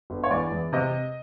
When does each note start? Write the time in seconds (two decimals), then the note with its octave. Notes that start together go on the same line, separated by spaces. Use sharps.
0.10 G1
0.24 C#5
0.31 E2 D5
0.52 E2
0.73 C3 D#5